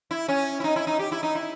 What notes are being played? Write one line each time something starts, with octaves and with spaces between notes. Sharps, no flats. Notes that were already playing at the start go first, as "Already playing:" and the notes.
E4
C#4
E4
D#4
E4
D#4
G4
E4
D#4
E4